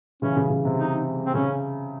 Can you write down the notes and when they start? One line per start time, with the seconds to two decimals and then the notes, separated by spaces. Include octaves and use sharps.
0.22 C#3 E3 C#4
0.36 C#3
0.50 C#3
0.65 C3
0.78 D#4
1.26 C4
1.34 C#3 C#4